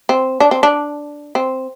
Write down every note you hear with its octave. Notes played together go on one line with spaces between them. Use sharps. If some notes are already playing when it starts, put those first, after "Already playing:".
C4
D4
C4
D4
C4